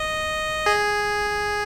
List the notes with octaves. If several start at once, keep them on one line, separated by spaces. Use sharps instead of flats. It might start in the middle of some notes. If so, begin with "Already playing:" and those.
Already playing: D#5
G#4